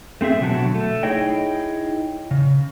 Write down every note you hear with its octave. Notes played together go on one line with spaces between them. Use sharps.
A3 C4 G#4 E5
B2 D3 F#3 F#4 A5
A3
D#4 E4 G#4 C#5 D#5 G5
C#3